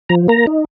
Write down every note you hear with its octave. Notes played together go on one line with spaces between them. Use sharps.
F3 A#5
A#3 A#5
D#4